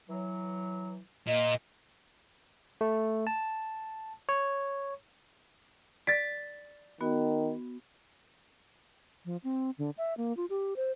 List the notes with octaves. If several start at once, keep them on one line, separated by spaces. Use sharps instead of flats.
E3 F#3
A#2 D#5
A3
A5
C#5
D5 A6 B6
D#3 B3 F#4
F3
C4
D3
E5
A#3
F4
G4
C5